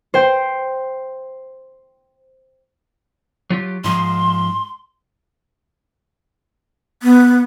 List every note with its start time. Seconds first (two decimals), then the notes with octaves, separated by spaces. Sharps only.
0.14 C5 G5
3.50 F#3 F4 G4
3.84 G#2 F3 G#3 C6
7.03 B3